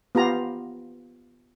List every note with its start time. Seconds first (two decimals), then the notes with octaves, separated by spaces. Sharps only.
0.15 B3 F4 G4 A#5